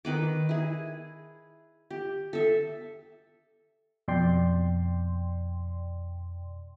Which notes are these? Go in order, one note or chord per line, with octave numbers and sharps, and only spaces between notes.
D#3 B4 D6
E4 G#4
G4
A4 E5
F2 B2 D5 G5 C6